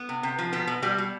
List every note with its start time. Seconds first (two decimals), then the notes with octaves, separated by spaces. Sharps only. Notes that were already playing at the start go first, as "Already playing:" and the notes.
Already playing: B3
0.09 C3
0.23 C3
0.38 F3
0.53 B2 B3
0.67 B2
0.82 B2 G3
0.98 B2